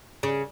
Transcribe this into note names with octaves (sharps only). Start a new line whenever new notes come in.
C#3